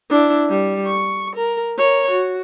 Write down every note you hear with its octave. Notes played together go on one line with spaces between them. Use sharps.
D4 E4
G3
C#6
A#4
A#4 C#5
F#4